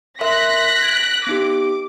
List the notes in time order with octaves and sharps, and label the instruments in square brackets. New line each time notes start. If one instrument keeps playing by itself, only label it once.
[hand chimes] A#4 E5 C6 [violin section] F#6 A#6 B6
[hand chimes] G#6 D7
[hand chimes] B3 D#4 G4 [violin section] D6